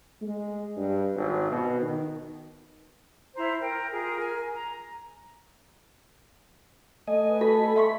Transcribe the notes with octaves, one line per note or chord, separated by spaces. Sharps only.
G#3
G2
G#1
B2
D#3
E4 C5 A#5
A#4 G5
F4 G#4 A#4
A#4 G#5
A#5
A3 D#5 G#5
B4
F#4 A4 D#5 B5
E5 C6 C#6